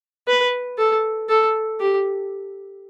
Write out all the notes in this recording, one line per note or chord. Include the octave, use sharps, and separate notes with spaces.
B4
A4
A4
G4